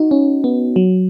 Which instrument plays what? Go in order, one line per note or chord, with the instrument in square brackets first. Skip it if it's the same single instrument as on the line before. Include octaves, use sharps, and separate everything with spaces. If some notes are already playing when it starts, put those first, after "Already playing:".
Already playing: [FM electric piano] D#4 F#4
C#4
B3
F#3